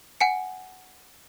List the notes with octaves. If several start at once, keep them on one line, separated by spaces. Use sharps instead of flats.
F#5 G#5 C#7